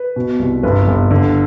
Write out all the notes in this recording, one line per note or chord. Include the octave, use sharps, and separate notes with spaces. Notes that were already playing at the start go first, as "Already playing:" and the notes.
Already playing: B4
B2
C2
G1 B4
G1
D3